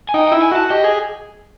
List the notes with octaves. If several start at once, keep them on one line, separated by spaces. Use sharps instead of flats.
G#5
D#4 G5
G5
E4
G#5
F#4 A5
G4 D#5
G#4